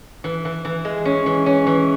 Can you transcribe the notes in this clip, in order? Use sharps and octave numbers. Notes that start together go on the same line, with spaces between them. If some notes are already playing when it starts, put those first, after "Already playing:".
E3
E3
E3
G#3
C#4
E3
C#4
E3